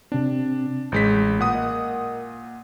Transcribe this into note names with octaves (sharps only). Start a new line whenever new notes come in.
C3 C4 D4
A1 G#3 G6 B6
A#2 F#5 D#6
A#4 D#5